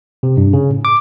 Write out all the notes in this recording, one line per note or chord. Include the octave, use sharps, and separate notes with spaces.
C3
G2
C#3
A2
D6